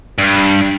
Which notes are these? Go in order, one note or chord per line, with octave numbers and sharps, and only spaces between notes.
G2